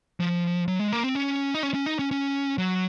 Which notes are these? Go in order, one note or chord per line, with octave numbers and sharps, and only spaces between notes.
F3
F#3
G#3
A#3
C4
C#4
D#4
C#4
C#4
D#4
C#4
C#4
F#3